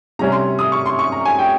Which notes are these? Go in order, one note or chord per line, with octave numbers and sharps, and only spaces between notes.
C3 G3 C#4 A#5
C6
D#6
C#6
C6
C#6
A#5
G#5
G5